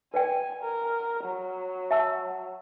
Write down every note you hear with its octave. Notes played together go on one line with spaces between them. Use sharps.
B4 D5 G5 G#5
A#4
F#3
E5 A5 E6